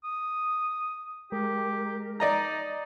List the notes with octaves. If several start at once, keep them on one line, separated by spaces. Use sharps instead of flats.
D#6
G#3 G4 A#4
D#4 D5 D#5 A#5